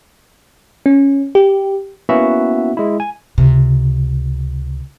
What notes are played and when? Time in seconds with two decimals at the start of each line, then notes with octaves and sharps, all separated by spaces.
0.86 C#4
1.35 G4
2.09 A#3 B3 C#4 E4 F#4 E5
2.77 G#3 E4
3.00 G#5
3.38 C#2 C3